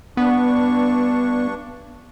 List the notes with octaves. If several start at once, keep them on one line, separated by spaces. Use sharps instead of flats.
G2 B3 D4 C#6